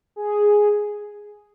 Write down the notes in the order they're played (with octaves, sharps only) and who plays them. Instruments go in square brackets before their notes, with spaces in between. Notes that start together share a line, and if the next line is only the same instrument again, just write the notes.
[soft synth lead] G#4